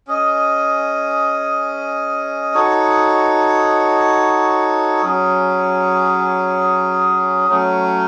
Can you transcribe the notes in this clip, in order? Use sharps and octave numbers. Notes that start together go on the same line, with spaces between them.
C#4 G#4 D#5
D#4 F#4 A4 C#5
F#3 C#4 G#4
F#3 A3 C#4